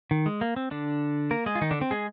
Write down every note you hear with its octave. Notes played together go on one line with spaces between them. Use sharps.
D#3
G#3
A#3
C4
D3 D4
A#3 A#4
G#3 G#4
F4
D#3 D#4
D3 D4
C4
G#3 G#4